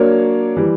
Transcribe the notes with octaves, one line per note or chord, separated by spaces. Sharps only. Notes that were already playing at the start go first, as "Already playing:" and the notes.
Already playing: F#3 A#3 D4 A#4 C#5
E3 G3